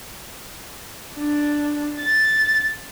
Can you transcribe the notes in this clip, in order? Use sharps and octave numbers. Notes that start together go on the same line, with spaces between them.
D4
A6